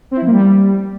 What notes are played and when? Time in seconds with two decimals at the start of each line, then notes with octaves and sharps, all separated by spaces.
0.11 C4
0.16 E4
0.22 F3
0.27 A#3
0.32 G3